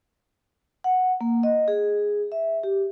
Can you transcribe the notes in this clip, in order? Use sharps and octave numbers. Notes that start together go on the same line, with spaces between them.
F#5
A#3
D#5
G#4
E5
G4